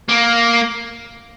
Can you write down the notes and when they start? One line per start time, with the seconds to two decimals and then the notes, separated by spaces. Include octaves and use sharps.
0.09 A#3